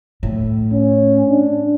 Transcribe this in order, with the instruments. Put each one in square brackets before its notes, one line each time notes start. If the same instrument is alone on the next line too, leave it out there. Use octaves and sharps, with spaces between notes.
[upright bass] A2
[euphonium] C#4
D4